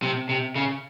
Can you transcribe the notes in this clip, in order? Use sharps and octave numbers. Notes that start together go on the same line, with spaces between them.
C3
C3
C#3